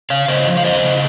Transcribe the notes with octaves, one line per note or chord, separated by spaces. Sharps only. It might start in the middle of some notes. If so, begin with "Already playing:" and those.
C#3 C#5 F5
C#3 C5 D#5
F3
F5
F3 C5 D#5
C#3